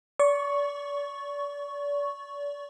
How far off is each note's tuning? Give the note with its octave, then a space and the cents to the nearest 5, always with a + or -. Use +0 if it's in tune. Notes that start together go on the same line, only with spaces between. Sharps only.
D5 -35 C#6 +0